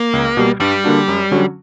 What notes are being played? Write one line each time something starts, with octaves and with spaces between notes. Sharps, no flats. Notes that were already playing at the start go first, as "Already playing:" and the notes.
Already playing: A#3
C#2
B2 G3
G2 G3
D3 A#3 D4 F#4
F#2
D3 F#3 C#4 F#4